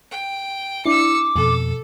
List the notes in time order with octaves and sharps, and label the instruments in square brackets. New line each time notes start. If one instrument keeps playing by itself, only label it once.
[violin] G5
[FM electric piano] D4 E4 [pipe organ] D6 [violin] E6 C#7
[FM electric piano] F2 B2 [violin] A4